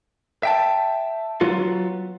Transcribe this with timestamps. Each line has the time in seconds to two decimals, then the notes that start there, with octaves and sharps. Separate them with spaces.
0.43 E5 G5 A5
1.41 F#3 B3 F4 F#4